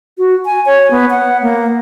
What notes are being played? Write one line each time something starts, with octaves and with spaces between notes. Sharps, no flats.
F#4
G#5
C#5
B3
F#5
A#3